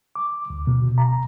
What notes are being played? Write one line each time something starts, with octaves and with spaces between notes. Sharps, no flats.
D6
D2
B2
A#5